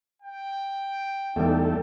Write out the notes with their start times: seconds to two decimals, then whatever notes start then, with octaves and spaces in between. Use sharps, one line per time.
0.22 G5
1.36 E2 G3 A3 D#4 G4 A4